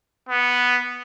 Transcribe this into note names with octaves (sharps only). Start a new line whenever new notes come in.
B3